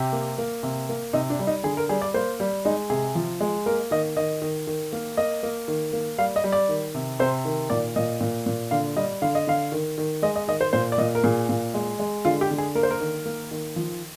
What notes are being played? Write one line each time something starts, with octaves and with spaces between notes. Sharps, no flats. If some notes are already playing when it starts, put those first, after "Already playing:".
Already playing: C3 G4
A#3
A#3
C3
A#3
C3 D#4
D4
G3
D#4
D3 G#4
A#4
G3 G#4
D5
A#3 C5
G3
G#3 D#4
C3 G#4
F3
G#3
A#3 A#4
D#3 D#5
D#3 D#5
D#3
D#3
A#3
A#3 D#5
A#3
D#3
A#3
G3 F5
D#5
G3
D5
D#3
C3
C3 C5
D#3
A#2 D5
A#2 D#5
A#2
A#2
D3 F5
G3 D#5
D3 F5
D#5
D3 F5
D#3
D#3
G#3 D#5
D#5
D#3 D#5
C5
A#2 C5
D5
A#2 D#5
A#4
A#2 G#4
A#2
G#3
G#3
D3 F4
G4
D3
G#4
A#3 A#4
C5
A#4
D#3
A#3
D#3
F3